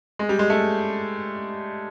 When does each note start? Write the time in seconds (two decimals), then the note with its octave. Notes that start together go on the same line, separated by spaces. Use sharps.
0.19 G#3
0.29 G3
0.39 G#3
0.50 A3